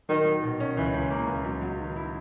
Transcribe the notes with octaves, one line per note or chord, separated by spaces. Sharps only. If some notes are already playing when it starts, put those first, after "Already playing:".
D#3 F#3
F#3
B2
C#4
C#2 E3
C#2
A#3
C#2
F#3
F#3
D#3
E4